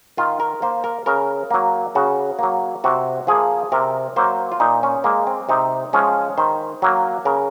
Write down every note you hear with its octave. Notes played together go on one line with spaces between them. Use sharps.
D#3 F4
A#4
A#3 C5
A#4
C#3 A#4
F#3 A#3
C#3 F#4
F#3 A#3
C3 F#4
F3 A#3 G#4
C3 A#4
F#3 A#3 C5
F4
A#2 D#4
C#4
G#3 A#3
C4
C3 D#4
F3 G#3 C#4
D#3 C5
F#3 A#3
C#3 A#4